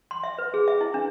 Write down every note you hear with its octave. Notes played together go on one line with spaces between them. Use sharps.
C6
E5
B4
G#4
E5
E4
D4